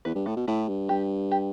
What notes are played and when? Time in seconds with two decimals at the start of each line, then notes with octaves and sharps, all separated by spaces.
0.05 E2 B4
0.15 G2
0.26 A2 A4
0.36 B2
0.48 A2 E4
0.68 G2
0.89 G2 G4
1.31 G4